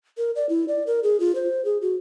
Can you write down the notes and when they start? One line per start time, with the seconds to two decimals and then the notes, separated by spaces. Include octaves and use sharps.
0.18 A#4
0.36 D5
0.49 E4
0.68 D5
0.87 A#4
1.03 G#4
1.20 F4
1.35 C5
1.65 G#4
1.82 F#4